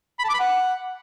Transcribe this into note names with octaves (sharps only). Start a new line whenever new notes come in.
B5
A5
D6
B5
F#5